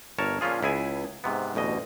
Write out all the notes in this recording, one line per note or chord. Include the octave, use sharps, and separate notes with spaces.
G1 A#4 C#5 A5
A#2 F3 C#4 F4 G#4
C#2 E4 G#4 G#5
G#2 C3 B3
A1 D2 B2 D#5